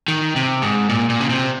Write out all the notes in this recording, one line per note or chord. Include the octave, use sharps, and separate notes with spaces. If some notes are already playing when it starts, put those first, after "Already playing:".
D#3
C3
G#2
A#2
A#2
C#3
C3